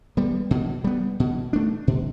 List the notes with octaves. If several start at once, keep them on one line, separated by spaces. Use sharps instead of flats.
G3 B3
B2
G3 B3
B2
A3 D4
B2